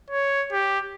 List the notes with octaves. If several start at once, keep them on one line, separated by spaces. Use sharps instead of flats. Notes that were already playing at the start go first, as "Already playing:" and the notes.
C#5
G4